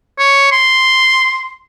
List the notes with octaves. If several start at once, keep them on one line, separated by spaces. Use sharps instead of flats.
C#5
C6